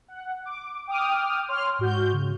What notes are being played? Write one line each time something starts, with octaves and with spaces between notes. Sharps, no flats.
F#5
D6
G5 D6 D#6 F6
C#5 C6 F6
G#2 F#4 G6
C#3